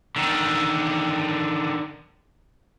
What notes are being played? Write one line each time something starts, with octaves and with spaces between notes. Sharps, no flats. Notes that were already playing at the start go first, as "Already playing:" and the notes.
D3 D#3